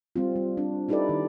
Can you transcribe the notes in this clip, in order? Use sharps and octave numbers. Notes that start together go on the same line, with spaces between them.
G3 C4 F4
G3
D4
D#4 E4 G4 A4 B4 D5
D#3